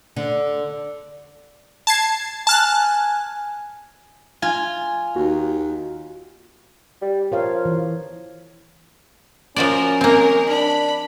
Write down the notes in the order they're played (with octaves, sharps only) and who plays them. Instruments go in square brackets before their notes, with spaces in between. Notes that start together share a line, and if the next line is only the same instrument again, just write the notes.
[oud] D3
[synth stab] A5 G#6 C7
[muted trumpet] G#5 [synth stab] A5 F6 F#6
[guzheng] F4 [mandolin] G#5
[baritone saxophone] D#2 [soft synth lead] F#4
[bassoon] G3
[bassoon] F3 [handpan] A#4 C#5 F5
[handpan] E3
[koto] F3 F#4 D5 [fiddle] A#3 A#4 [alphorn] C#4
[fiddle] G#3 A#4 [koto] A#3 C4
[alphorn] D4 [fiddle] B5